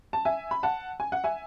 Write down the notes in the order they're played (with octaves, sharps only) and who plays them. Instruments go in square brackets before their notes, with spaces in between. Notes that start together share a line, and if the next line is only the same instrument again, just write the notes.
[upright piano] A5
E5 G#5
B5
F#5 A5
G#5
F#5
E5 G#5